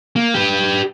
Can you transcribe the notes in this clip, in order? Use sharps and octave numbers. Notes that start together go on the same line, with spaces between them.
A#3
G4 B4